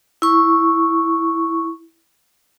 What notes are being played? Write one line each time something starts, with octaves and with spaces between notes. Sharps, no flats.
E4 C#6